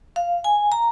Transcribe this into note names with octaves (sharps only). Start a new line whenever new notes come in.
F5
G#5
A#5